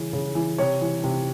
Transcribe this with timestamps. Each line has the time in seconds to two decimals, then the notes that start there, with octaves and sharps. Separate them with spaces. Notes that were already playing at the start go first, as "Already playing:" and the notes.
Already playing: C#3 E3
0.13 C#3
0.35 E3
0.58 C3 C#5
0.81 E3
1.04 C3